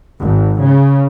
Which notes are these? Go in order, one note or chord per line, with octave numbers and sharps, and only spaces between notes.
G#1
C#3